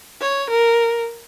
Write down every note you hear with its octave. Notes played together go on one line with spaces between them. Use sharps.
C#5
A#4